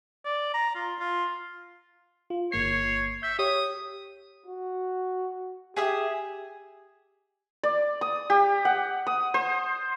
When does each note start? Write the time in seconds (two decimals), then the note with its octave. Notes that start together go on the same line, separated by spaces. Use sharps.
0.25 D5
0.54 A#5
0.75 F4
0.99 F4
2.30 F4
2.52 G1 A#3 C#5 C7
3.23 E5 G6
3.39 G4 C#5 D#6
4.46 F#4
5.76 G4 G#4 E5 D#6
7.63 D5
8.01 D#6
8.30 G4
8.65 F#5
9.07 D#6
9.34 C5